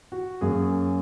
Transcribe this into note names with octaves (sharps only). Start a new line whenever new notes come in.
F#4
F#2 F#3 A#3 C#4 G#4